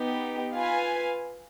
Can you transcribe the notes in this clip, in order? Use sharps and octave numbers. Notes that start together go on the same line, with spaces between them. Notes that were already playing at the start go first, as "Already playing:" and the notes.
Already playing: B3 D#4 G4
F4 B4 F5 G#5